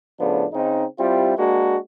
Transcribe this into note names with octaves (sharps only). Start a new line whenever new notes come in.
A2 C#3 F3 B3 D4
C#3 C4 D#4
G3 C4 E4 F4 G4
G#3 A#3 D4 F#4 A#4